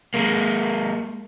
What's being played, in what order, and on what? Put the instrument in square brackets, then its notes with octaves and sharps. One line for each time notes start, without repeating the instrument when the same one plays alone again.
[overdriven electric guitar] G#3 A#3